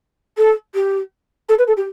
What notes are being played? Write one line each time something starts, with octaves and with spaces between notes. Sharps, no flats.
A4
G4
A4
B4
A4
G4